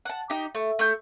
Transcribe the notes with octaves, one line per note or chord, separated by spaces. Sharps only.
F#5 A5
D#4 G4
A3
A3 G6